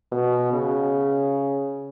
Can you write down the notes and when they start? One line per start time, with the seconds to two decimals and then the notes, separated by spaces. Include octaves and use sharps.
0.12 B2
0.53 C#3